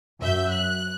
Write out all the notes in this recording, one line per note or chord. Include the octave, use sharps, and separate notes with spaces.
F#2 E5 G6
F#6